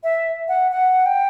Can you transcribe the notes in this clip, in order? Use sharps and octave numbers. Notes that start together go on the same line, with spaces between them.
E5
F#5
F#5
G5